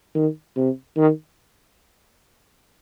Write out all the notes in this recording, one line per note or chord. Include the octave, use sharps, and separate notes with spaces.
D#3
C3
D#3